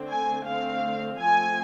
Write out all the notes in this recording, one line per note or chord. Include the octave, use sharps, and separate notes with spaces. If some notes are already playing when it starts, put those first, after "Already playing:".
Already playing: D3 A3 C4
G#5
D3 A3 C4 F5
F3 A3 C4 G#5